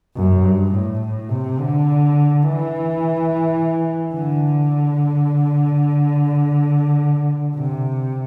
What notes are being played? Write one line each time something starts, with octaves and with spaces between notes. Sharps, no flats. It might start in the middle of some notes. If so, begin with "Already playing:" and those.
F#2
G2
A2
A2
C3
D3
E3
D3
C3